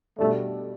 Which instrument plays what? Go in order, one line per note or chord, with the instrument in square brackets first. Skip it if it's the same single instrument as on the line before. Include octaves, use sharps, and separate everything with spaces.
[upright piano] B2 G3 D4 [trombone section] A3